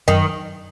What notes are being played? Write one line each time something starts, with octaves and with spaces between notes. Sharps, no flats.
F#2 D#3